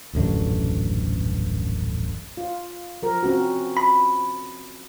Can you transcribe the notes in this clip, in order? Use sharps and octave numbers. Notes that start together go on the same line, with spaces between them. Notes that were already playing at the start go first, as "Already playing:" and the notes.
D#1 A1 F#2 D3
F4
F3 A#4
C4 C#4 F#4
B5